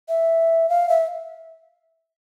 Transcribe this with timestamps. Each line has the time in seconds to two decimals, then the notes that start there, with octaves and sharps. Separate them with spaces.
0.09 E5
0.69 F5
0.89 E5